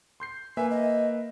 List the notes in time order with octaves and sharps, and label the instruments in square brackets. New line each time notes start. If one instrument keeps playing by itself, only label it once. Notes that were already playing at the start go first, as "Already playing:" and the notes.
[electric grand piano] C6 G6 C7
[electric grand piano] A#3 B4 E5 [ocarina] G#5
[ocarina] D#5